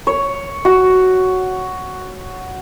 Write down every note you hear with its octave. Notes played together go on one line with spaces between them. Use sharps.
C#5
F#4